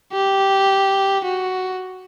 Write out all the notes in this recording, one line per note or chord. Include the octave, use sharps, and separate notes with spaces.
G4
F#4